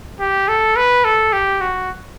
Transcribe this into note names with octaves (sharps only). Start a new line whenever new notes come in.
G4
A4
B4
A4
G4
F#4